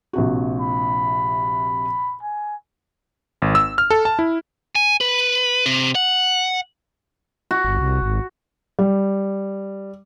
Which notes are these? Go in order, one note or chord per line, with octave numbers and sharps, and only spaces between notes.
A#1 C3 F#4
B5
G#5
G#1
E6
F6
A4
A5
E4
G#5
B4
C3
F#5
F#4
G1
C2
G#1
G3